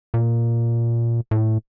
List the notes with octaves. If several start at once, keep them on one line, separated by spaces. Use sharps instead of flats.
A#2
A2